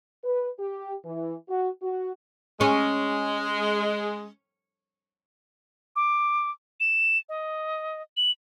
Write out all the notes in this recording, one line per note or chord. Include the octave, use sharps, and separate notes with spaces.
B4
G4
E3
F#4
F#4
G#3 C#4
D6
E7
D#5
F#7